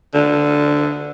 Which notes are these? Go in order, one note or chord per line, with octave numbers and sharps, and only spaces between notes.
D3